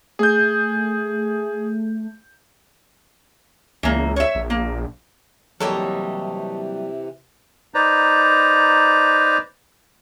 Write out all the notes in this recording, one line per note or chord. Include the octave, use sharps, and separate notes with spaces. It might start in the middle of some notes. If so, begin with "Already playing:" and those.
A3 G#4 G6
C#2 E3 A#3
C#5 E5
A#1
A#3
C3 E3 F#3 G3 A#3 A4 C#5 D#5
D#4 B4 C5 D5 A#5